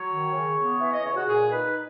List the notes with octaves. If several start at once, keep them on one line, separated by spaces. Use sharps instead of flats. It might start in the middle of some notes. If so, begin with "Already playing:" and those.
Already playing: F#3 C#5
D#3
C#3
B3
E3 E5
D#5
C#3 C#5
F#4
A#2 G#4
D#4 B4